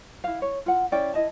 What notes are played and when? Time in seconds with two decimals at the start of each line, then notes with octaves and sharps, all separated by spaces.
0.24 E4 F5
0.42 C#5
0.66 F4 F#5
0.92 C#4 E4 D5 G5
1.14 E4 D#5 A5